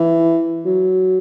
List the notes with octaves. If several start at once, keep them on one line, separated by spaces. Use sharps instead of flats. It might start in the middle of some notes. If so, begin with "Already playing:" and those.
Already playing: E3
F#3